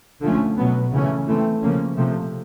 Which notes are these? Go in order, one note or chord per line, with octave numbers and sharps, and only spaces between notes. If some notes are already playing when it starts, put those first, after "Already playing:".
D3 F3 A3 C#4
B2 F#3 B3
C#3 E3 A3 C#4
E3 A3 C4
C#3 F3 A#3 C#4
C3 F3 A3